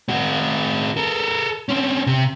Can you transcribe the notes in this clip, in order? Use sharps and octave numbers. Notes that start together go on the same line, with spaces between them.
C4 F#4
A4 A#4
C4 C#4
C3